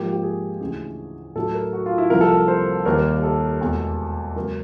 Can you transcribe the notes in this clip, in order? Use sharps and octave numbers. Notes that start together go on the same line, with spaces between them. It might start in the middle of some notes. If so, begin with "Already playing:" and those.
Already playing: G#2 F3 A#3 G4
G4
G#4
D2 C#3 E3 G#4
A2 F#3 A3 A4
A#4
F#4
F4
E4
C2 C3 F3 A#3 A#4
A4
A#4
C5
D#2 D#3 G3 A#3 A#4
A4
E2 B2 G#3
C#2 C#3 F#3 A#3 A#4